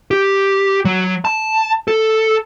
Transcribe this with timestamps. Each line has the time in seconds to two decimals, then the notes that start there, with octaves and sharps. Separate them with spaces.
0.11 G4
0.85 F#3
1.25 A5
1.88 A4